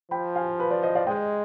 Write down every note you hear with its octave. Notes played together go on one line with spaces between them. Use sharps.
F3 G5 B5
F5 G#5
B4
B4 D5
C5 D#5
D5 F5
G#3 D#5 G5